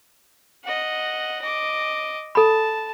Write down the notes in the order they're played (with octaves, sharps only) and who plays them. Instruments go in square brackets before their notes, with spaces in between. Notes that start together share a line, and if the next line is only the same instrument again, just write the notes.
[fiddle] D#5 F#5
D#5 D6
[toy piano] A4 B5 [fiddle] A5